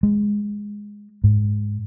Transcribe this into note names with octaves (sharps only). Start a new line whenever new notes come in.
G#3
G#2